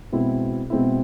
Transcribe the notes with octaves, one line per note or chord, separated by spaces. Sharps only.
B2 G#3 C4 E4
B2 G#3 C4 E4